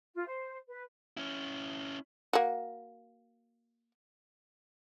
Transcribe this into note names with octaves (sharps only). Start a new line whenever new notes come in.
F4
C5
B4
C#4 E4
A#3 F#4